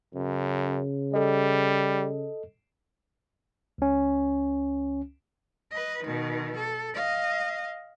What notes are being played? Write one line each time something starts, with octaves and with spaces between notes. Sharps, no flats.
F#2 C#3
G3 A4 D#5
C#2 C#4
B4 D#5
B2 D#3
A4
D#5 F5